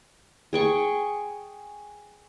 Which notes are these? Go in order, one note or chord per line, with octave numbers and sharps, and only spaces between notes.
G#4 G5 C#6